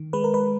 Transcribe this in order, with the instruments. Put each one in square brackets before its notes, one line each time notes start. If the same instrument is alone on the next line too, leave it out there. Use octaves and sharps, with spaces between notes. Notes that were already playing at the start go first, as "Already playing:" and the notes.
Already playing: [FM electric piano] D#3
G#3 B4
A#4
B4